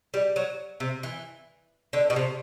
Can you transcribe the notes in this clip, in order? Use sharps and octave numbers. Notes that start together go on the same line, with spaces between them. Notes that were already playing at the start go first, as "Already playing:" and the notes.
G3
F#3
C3
E3
D3
B2
C3